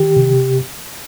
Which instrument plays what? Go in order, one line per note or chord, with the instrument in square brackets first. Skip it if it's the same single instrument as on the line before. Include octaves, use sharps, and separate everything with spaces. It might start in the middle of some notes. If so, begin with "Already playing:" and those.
Already playing: [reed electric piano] D#3 G4
C3